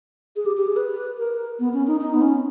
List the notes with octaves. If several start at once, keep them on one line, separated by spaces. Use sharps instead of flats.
G#4
G4
G4
G#4
B4
A#4
B3
C#4
D#4
D#4
B3
C#4